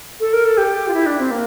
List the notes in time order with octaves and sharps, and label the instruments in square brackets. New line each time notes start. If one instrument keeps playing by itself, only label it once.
[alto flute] A4
A#4
A4
G4
F4
E4
D4
C4
A#3